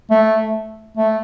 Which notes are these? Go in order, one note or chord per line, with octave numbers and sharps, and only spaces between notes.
A3
A3